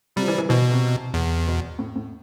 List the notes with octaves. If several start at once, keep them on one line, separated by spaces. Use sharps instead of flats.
C3 G3
F3
E3
E3
B2 E3
C3
E2
B2
A2
A2